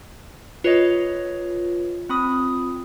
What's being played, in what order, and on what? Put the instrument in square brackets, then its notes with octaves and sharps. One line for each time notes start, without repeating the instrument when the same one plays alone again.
[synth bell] F4 [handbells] B4 C#5 D#5
[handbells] C4 B5 D#6